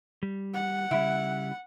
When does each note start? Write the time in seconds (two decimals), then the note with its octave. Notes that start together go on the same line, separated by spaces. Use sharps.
0.23 G3
0.54 F#5
0.91 C#3 G3 E4